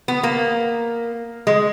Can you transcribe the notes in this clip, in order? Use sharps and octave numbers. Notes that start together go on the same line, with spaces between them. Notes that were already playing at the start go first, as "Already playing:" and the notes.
B3
A#3
G#3